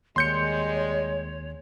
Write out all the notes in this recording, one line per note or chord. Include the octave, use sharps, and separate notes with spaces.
D#2 G3 G#3 C#5 C6 G6 C#7